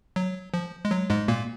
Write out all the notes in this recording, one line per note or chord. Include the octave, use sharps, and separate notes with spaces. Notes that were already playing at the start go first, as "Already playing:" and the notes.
F#3
F3
G#3
F#3
G#2 G#3
A#2 A#3